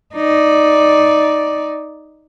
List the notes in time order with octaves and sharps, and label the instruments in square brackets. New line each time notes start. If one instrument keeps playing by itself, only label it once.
[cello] D#4 D5